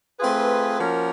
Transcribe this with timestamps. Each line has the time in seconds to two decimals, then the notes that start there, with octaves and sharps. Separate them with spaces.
0.20 A3 C4 F4 G#4 B4
0.80 F3 A#3 C#4 F#4 A#4